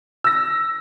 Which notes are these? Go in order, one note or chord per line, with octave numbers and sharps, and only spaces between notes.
E6 A#6